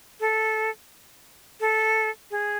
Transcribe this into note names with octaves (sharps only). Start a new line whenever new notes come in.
A4
A4
G#4